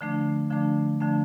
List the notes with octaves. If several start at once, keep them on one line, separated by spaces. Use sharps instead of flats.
D3 F3 A3 D4
D3 F3 A3 D4
D3 F3 A3 D4